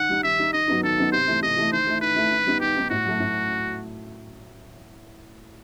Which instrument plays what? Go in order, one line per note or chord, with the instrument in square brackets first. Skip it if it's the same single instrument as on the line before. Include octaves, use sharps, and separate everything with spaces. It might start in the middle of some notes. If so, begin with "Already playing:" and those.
Already playing: [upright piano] D#3 [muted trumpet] F#5
[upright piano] G3 D#4
[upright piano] D#3 [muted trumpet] E5
[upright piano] G3 D#4
[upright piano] D#3 [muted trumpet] D#5
[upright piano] F#3 B3 D#4
[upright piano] D#3 [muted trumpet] A4
[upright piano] F#3 B3 D#4
[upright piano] C3 [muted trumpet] C5
[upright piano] E3 A3 E4
[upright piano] C3 [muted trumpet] D#5
[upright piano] E3 A3 E4
[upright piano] D#3 [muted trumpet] C5
[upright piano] A3 E4
[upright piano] D#3 [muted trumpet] B4
[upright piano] A3 E4
D#3
G3 B3 D#4
[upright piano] D#3 [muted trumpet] G4
[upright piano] G3 B3 D#4
[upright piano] A2 [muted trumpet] F#4
[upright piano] F#3 A3
A2